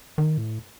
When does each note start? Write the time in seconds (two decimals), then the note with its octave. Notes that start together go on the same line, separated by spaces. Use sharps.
0.18 D#3
0.38 A2